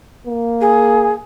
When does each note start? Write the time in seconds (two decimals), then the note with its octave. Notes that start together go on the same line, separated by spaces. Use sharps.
0.27 A#3
0.60 G#4